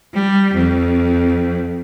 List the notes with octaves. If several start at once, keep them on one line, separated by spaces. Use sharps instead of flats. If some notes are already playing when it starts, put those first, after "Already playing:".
G3
F2